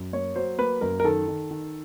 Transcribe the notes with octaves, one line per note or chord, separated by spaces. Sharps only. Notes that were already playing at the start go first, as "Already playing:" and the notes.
Already playing: F#2
A#3 C#5
F#3 C5
A#3 B4
F#2 A#4
A#4
D#3 A4
D#3
D#3